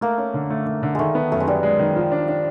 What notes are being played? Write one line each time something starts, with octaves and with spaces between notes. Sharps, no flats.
A3 A#3
C#4
D3
A3
A3
D3
D#3 G#3 A3
B3
F#2 A3
G#3
G3 B3
G#3
D#3
F3
D4
D4